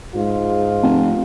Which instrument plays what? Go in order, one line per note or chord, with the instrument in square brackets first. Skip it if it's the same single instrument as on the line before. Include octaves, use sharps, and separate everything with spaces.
[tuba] G#2 [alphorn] F4
[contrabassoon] F1